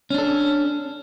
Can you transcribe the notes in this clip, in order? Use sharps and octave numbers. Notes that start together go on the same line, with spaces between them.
C#4 D4 A4